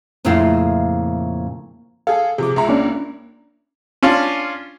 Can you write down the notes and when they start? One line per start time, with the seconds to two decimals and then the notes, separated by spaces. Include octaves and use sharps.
0.25 F2 A#2 C#3 A3 E4 F4
2.07 G#4 A4 F5
2.38 C3 F3 G#4 D6
2.56 C#2 E5 A#5
2.69 A#3 C#4 D4
4.03 C#4 D4 F4